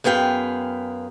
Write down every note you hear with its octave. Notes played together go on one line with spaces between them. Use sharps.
F#2 B3 G#4 F5 G5